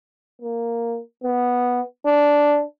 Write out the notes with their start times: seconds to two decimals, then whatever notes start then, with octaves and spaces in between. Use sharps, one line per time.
0.42 A#3
1.24 B3
2.06 D4